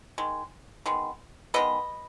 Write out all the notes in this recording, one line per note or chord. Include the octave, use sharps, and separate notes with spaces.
D#3 G#3
D#3 G#3 B3
D#3 G#3 B3 B4 D#5